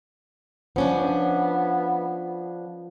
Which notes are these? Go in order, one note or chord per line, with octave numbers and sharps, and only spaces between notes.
F3 B3 C#4 D4